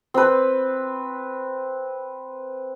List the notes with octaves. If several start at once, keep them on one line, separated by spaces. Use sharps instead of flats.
C4 B4